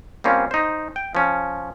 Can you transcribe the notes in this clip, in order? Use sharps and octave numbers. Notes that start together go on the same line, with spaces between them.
G3 A#3 C4 C#4 F4
D#4 C5
G5
F3 C#4